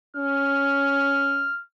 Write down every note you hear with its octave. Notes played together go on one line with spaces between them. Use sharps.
C#4 F6